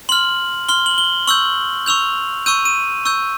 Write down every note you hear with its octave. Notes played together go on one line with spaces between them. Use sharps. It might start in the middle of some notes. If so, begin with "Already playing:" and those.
C6 F6 F#7
C6 F6 G7
F#7
G7
C#6 E6 G6 F#7
C#6 E6 G6 F7
C#6 E6 G6 D#7
D#7
C#6 E6 G6